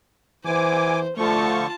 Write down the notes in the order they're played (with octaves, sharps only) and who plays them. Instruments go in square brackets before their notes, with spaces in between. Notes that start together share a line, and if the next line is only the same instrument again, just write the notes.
[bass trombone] E3 [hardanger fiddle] C5 [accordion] G#5 D6
[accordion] D3 F3 C#6 [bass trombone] A3 [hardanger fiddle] F4 A5